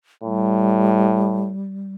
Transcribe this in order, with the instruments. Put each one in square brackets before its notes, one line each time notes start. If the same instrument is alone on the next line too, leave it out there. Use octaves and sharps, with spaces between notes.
[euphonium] A2 [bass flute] G3